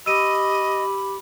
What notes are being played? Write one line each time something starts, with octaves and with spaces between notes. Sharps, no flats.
G4 D#5 B5 E6 D#7